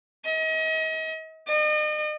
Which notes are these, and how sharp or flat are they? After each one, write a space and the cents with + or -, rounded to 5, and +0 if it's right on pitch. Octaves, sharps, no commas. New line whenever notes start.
D#5 +35
D#5 -40